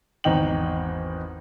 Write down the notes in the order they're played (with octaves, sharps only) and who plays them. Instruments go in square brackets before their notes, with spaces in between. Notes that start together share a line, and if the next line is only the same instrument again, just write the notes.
[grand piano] G#1 E2 D#4 G5 F#7